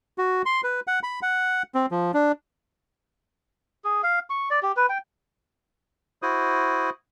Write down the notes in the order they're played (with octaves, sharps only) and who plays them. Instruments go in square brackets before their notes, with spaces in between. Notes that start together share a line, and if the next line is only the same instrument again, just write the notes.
[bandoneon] F#4
C6
B4
F#5
B5
F#5
C4
F3
D4
[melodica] G#4
F5
C#6
D5
G4
B4
G5
[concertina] E4 F#4 C5 D#6